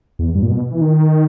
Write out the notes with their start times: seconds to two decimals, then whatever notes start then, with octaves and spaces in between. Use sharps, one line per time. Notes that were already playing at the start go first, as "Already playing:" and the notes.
0.19 E2
0.35 G2
0.42 A#2
0.50 B2
0.71 E3
0.81 D#3